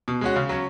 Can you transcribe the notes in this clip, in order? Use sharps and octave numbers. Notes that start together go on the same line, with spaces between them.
B2
G#3 C#4 F#4
C#3
F#3 C#4